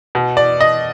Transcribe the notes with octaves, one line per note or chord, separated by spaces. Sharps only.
B2
D5
D#5